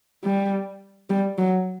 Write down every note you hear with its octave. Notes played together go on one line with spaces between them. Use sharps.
G3
G3
F#3